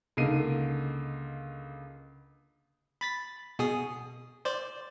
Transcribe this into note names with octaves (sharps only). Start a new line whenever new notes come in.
C#2 D3 A#3 D#4 C7 D#7
B5 A6 B6
B2 G#4 D#6
C5 D5